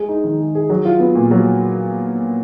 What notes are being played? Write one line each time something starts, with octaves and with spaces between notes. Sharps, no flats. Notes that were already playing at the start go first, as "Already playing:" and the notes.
Already playing: G#3 G#4
D#4
D#3
G#3
G#4
F#3
F4
B3
A#2
F#3